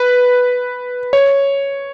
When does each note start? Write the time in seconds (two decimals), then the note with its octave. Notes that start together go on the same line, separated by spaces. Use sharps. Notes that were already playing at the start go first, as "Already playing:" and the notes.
Already playing: B4
1.13 C#5